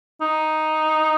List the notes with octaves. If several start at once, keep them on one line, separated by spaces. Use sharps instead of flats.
D#4